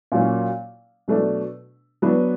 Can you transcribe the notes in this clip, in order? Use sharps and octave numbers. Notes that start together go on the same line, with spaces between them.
A#2 F#3 A#3 C#4
B2 F#3 A3 D4
F#3 B3 D4